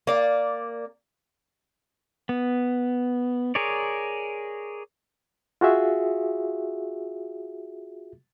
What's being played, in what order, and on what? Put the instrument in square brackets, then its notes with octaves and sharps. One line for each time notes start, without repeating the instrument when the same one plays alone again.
[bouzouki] A#3 D5
[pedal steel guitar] B3
G#4 A#4 C#5 D5
[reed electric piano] F4 F#4 G#4 E5